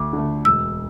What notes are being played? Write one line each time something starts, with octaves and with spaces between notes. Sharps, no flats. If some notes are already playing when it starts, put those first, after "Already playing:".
Already playing: D2 D6
D3
A3
E1 E6